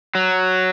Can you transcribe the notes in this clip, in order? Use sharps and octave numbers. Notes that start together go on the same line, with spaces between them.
F#3